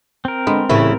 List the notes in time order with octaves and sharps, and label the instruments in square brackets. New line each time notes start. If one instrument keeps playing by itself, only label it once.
[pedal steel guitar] C4 A#4
[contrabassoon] D3 [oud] G#3 [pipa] B3
[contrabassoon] C2 [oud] A2 C#3 E3 [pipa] E4